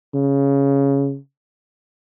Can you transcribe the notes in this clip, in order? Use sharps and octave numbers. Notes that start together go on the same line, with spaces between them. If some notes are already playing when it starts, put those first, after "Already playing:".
C#3